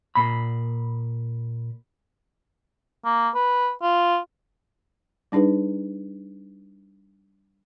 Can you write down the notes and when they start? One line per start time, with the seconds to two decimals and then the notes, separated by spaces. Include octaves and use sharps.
0.15 A#2 B5
3.05 A#3
3.34 B4
3.82 F4
5.32 G3 D4 D#4 G#4 B4